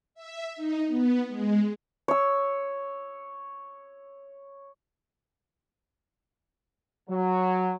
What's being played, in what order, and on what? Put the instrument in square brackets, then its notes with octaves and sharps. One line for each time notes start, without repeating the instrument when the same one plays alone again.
[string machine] E5
D#4
B3
G#3
[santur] C#5 E6
[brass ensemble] F#3